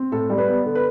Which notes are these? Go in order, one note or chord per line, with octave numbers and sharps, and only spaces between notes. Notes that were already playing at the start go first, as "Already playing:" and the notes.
Already playing: C4
A2 A4
G3
B4
B3
D3
B4